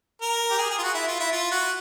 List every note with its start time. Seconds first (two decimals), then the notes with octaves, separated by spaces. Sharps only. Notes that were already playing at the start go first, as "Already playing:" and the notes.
0.21 A#4
0.51 G4
0.58 G#4
0.70 G#4
0.78 F4
0.83 F#4
0.95 E4
1.08 F4
1.20 E4
1.32 F4
1.51 F#4